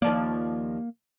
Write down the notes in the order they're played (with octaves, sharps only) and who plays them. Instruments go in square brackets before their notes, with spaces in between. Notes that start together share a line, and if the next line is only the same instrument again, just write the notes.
[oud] D#2 F3 D5 [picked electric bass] A#3